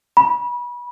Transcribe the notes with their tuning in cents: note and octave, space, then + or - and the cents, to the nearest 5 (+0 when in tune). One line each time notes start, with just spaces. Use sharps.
B5 -30